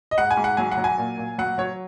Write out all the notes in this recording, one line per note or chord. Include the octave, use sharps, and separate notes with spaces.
D#5
G#2 F#5
G#5
G#2
F#5
F#3 G#5
F#5
F#3
G#5
A#2
A#2
F#3 F#5
F#3 C#5